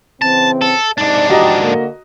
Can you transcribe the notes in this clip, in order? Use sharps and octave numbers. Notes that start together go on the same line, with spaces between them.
C#3 E3 C4 A5
A4
G#2 C3 D4 D#4 D5
E3 F3 F#4 G4 D#5 A#5
D3 A#3